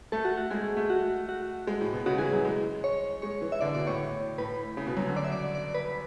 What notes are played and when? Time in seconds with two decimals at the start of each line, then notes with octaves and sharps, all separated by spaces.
0.12 A3 A4
0.25 F#4
0.37 F#4
0.51 G#3 G#4
0.63 A3
0.77 A3
0.90 F#4
1.29 F#4
1.67 G#3
1.81 A2
1.93 B2
2.06 C#3 F#4
2.18 E3 G#4
2.33 F#3
2.45 G#3
2.84 C#5
3.22 G#3 C#5
3.42 E3
3.52 E5
3.61 D3 D5
3.75 B2 D5
3.87 A2 C#5
4.38 A2 B4
4.77 C#3
4.87 B2
4.97 F#3
5.07 D3
5.17 D5
5.25 E5
5.32 D5
5.55 D5
5.75 B4